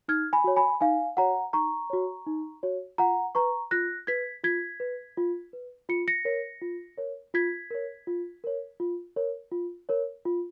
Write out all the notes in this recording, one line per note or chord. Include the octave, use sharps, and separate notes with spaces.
D#4 F6 G#6
G#5 B5
F#4 C#5
G#5 B5
D#4 F5 G#5
F#4 C#5 F#5 A#5
D#4 A#5 C#6
F#4 C#5
D#4
F#4 C#5
F4 F#5 A#5
B4 A#5 C#6
F4 F#6 A#6
B4 G#6 B6
F4 G#6 B6
B4
F4
B4
F4 C#7
A#6 C#7
A#4 C#5
F4
A#4 C#5
F4 G#6 B6
A#4 C#5
F4
A#4 C#5
F4
A#4 C#5
F4
A#4 C#5
F4